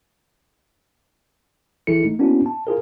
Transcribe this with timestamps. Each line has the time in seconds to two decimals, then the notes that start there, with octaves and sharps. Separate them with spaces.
1.87 G#1 E3 E4 G#4 A4 C#7
2.03 A3 D#4
2.19 A#3 B3 C#4 D4 E4 F#4
2.46 A5
2.67 F4 G#4 A#4